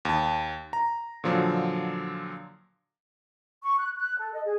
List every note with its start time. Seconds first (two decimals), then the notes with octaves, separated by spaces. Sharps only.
0.05 D#2 A5
0.73 A#5
1.24 A#2 D3 F3 F#3
3.63 C#6
3.78 F#6
3.95 F#6
4.19 A4
4.33 D#5
4.45 G#4